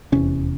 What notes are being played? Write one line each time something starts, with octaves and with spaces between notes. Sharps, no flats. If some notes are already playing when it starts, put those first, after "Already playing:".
F1 E2 C3 C#4